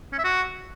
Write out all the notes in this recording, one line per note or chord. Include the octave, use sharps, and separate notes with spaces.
C#4
E5
F#4